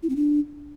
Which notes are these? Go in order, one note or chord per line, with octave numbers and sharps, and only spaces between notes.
E4
C4
D4